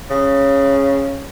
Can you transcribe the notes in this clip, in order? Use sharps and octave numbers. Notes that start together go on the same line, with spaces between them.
C#3